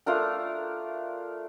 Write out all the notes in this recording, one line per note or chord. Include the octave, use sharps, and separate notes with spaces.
A3 D4 F4 A#4